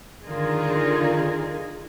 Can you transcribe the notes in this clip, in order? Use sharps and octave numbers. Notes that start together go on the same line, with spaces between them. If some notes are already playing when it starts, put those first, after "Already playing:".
D3 D#3 D#4 F4 G#4 A#4